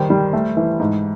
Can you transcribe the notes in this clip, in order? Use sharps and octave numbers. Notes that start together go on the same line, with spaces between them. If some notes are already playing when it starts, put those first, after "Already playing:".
Already playing: D#3 G3 C5
G3
A3
E3
G#2